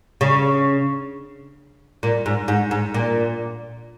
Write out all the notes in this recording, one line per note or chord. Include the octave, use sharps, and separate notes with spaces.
C#3
A#2
G#2
G#2
G#2
A#2